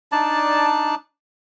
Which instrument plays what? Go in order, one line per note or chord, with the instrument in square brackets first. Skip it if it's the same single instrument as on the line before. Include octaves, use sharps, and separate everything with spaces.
[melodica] D4 D#4 D5 A5